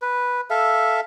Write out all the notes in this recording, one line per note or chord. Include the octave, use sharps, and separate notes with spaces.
B4
A4 E5 F5